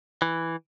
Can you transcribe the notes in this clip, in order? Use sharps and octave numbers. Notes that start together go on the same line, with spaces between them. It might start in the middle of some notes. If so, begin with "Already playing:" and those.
E3